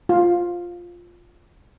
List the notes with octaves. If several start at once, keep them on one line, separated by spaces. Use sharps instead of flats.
F4